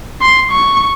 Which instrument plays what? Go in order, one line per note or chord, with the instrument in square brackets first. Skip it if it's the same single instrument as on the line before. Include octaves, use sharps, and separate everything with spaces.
[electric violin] C6
C#6